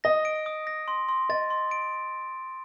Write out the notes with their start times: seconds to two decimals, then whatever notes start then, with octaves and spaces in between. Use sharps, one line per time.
0.04 D#5 A#6
0.25 D7
0.46 D#6
0.67 A#6
0.88 C6
1.09 C6
1.29 D#5 A6
1.50 C6
1.71 D7